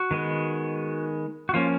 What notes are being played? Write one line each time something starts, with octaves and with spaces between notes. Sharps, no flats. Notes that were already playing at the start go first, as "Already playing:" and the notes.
Already playing: F#4
D#3 G#3 B3
F#4
F3 A#3 C#4 F4